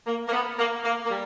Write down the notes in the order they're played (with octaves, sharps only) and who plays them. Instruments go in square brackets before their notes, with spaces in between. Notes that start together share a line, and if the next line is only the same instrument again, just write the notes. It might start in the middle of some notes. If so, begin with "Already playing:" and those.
[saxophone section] A#3
A#3
B3
A#3
A#3
A#3
G3